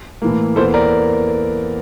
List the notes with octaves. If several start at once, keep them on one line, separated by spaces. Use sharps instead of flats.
A2 E3 A#3
E2 E3 A#3 A4 C5
A#4 D5